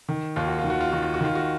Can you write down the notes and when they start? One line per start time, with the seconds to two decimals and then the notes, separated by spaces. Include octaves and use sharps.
0.09 D#3
0.36 D#2 F4
0.47 F#4
0.59 F4
0.64 D#3
0.70 F#4
0.81 F4
0.92 D#3 F#4
1.02 F4
1.14 F#4
1.21 D#3 F4
1.35 F#4